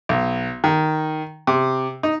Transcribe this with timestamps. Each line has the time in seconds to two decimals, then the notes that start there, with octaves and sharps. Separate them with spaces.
0.09 B1
0.64 D#3
1.47 C3
2.03 D#4